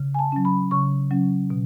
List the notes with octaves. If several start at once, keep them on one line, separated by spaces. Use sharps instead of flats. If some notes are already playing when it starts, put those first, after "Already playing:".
Already playing: C#3
G#5
A5
F#3 C#4
B5
C#3 C#6
F#3 C#4
B2